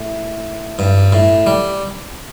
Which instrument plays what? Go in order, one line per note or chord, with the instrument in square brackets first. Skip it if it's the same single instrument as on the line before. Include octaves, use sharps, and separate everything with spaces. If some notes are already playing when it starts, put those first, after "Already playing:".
Already playing: [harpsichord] A2
G2
A2
G3